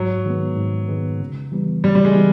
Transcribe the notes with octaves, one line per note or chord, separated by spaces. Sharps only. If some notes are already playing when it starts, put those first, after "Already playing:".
Already playing: G#2 F#3
D#3 G#3 B3
G#2
D#3 G#3 B3
C#3
E3 G3 B3
C#3 G3
G3
G#3
E3 G3 B3